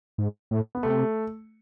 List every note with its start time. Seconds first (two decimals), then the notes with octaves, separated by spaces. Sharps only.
0.18 G#2
0.51 A2
0.75 B3
0.83 C3 A3